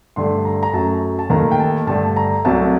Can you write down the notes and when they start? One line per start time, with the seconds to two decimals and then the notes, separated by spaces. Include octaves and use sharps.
0.16 G2 D3 A3 C6
0.45 A#5
0.63 A#5
0.73 F#2 F#3 A3 A5
1.19 A5
1.30 D#2 D#3 A3 A#5
1.51 G5
1.59 A5
1.87 G2 D3 A3 A5
2.16 A#5
2.45 C2 C3 F#3 A3 A5